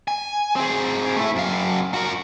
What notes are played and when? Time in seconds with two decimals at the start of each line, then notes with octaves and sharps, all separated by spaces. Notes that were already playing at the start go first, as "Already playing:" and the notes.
0.08 G#5
0.56 C4 G#4
1.16 A3 E4
1.36 F#2 F5
1.94 F#4 A#4